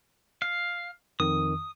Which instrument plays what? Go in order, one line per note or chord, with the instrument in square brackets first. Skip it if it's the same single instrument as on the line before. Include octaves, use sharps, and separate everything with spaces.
[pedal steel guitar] F5
[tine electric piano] F2 D#3 [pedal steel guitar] D#6